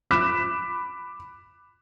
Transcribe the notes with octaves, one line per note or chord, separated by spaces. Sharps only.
B5 D6 F#6 B6 E7